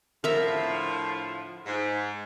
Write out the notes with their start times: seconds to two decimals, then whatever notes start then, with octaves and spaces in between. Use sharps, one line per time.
0.24 A2 D3 F3 A#4 E5
1.66 G#2